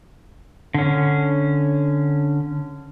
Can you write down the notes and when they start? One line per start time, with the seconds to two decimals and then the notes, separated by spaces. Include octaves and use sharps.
0.74 D3 C#4